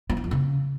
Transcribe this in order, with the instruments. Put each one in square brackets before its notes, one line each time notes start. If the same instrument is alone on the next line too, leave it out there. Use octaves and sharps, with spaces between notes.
[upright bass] F3
E3
F2
C#3